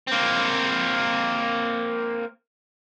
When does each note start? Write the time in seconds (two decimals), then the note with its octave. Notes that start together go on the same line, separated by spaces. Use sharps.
0.08 A#3 C4